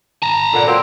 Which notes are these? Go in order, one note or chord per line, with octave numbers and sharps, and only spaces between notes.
A5 A#5
A#2 D3
F#3 A#3 C4